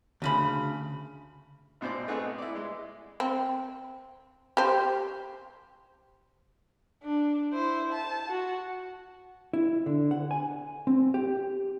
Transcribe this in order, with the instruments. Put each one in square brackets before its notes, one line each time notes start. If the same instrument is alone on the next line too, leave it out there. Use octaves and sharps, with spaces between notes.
[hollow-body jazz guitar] D2 C#3 B5
[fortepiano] G#1 B2 C5 D5 D6
A3 B3 C4 D#4 G#4 F#5
E4 D5
G#3
[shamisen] C4
G4 C5
[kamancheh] D4
E4 C5
A5
F#4
[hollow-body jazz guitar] E4
D3
F#5
G#5
C4
G4